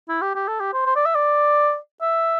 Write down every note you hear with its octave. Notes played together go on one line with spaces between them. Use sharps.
E4
G4
G4
A4
G4
C5
C5
D5
E5
D5
E5